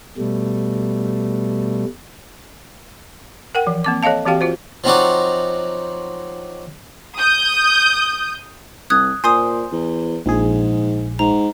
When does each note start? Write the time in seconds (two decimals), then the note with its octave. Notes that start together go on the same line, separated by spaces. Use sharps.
0.18 B2 G3 A3
3.55 A#4 F#5 G5
3.67 E3 F3
3.84 A#3 C4 D6
4.03 A4 C#5 D#5 F5 A5
4.26 E3 C4 F#4 G4 F5 G5
4.41 F4 F#4 C5
4.84 F3 F#3 C4 D#4 F#4 D5
7.18 D#6 G6
8.90 C2 D#6 F#6 G#6
9.24 A#2 C5 G#5 C6 D#6
9.72 E2
10.26 A#1 G#2 G#4
11.19 G#2 A#5